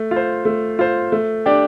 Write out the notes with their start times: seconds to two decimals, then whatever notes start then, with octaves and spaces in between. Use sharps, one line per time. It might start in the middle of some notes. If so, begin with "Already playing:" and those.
Already playing: A3
0.11 F4
0.16 C5
0.45 A3
0.79 F4 C5
1.12 A3
1.46 D4 G4 D5